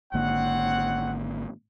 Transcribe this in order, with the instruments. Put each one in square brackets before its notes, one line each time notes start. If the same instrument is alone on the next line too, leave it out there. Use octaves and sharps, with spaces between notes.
[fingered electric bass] G#1 D3 A#3 [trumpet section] C4 C#5 F#5